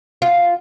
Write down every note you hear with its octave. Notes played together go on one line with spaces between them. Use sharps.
F4